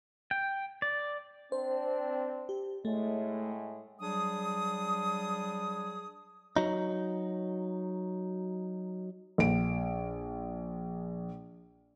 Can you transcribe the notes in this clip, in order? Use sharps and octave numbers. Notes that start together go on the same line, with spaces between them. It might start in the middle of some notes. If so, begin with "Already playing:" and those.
G5
D5
C4 D4 C5
G4
A2 G#3 A3
F#3 G3 D4 G#4 D#6
F#3 D#4
A#1 D7